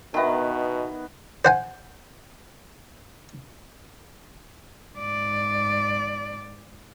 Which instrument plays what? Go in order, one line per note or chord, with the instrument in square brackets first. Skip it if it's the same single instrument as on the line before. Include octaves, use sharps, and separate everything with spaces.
[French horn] B2 [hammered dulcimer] D#3 B3 [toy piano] E5 G5 A5
[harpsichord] C5 F#5 G#5
[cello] G#2 D5